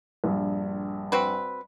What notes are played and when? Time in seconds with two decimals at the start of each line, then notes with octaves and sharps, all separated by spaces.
0.24 A#1 G2
1.12 C4 F#4 B4